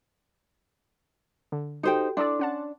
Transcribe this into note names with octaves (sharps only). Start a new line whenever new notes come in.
D3
D#4 F#4 G4 A4 C5 G5
D4 E4 A4 D5 C6 D6
C#4 F#5 A5